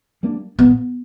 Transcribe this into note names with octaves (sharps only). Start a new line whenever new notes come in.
G3 A#3 D4
A#2 B3